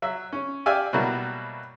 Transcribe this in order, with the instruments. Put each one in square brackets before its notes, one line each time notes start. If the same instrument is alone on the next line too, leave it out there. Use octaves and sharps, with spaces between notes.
[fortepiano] F#3 E5
C#4
G4 D5 E5 F5 G#5 D6
B2 F#3 G3 A#3 E4 F#4